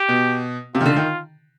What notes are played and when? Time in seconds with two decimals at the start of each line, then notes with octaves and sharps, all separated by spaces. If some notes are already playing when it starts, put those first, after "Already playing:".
Already playing: G4
0.09 B2
0.75 C3 F4
0.81 D#3
0.86 D3
0.96 D#3